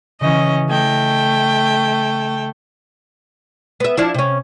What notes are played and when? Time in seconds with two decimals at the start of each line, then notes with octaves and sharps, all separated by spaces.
0.21 C#3 E3 C#4 D#5
0.69 A3 D#5 G5 G#5
3.80 B3 E5
3.97 F3 D4 E4
4.14 C3 C#4